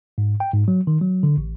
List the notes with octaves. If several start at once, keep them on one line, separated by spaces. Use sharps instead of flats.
G#2
G5
G#2
F#3
D#3
F#3
D3
A1